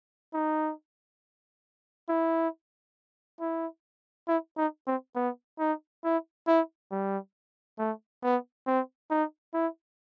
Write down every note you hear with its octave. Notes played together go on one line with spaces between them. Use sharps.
D#4
E4
E4
E4
D#4
C4
B3
D#4
E4
E4
G3
A3
B3
C4
D#4
E4